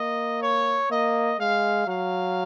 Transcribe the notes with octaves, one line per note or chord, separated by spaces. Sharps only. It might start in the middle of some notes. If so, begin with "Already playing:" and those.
Already playing: A#3 D#5
C#5
A#3 D#5
G#3 F5
F#3 F5